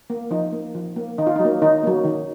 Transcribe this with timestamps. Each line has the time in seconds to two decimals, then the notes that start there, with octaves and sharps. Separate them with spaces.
0.10 A#3
0.31 F3 D#4
0.53 A#3
0.75 F3
0.96 A#3
1.18 D#3 D#4
1.27 F4
1.36 F#3 D#4
1.45 A#3
1.62 D#3 D#4
1.83 F#3 A#3
2.05 D#3